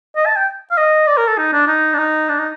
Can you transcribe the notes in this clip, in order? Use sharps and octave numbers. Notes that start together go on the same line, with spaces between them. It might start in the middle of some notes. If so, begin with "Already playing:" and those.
D#5
A5
G5
F5
D#5
D5
A#4
A4
D#4
D4
D#4
D4
D#4
D4
D#4